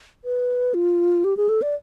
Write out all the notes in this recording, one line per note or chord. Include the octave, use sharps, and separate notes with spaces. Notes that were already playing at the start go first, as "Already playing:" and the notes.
B4
F4
G4
G#4
A4
D5